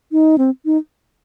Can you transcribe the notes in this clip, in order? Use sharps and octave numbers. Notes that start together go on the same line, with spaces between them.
D#4
C4
D#4